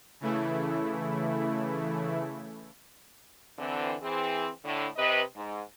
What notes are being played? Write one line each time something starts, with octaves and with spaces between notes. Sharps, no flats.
C#3 E3 A3 E4
D3 E3 C4
E3 C4 G#4
A2 D3
C3 B4 D#5
G#2